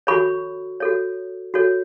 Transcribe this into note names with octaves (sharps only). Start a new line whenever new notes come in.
F#4 A4 C#5 B5 C#6
F#4 A4 C#5
F#4 A4 C#5